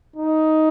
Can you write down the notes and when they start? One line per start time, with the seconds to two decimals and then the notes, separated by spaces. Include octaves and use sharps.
0.16 D#4